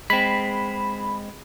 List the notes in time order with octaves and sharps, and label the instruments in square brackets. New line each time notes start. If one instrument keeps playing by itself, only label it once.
[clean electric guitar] G#3 C4 [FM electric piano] B5